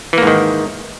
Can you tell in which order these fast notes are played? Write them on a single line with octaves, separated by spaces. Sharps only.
E3 A#3 G#2 D#3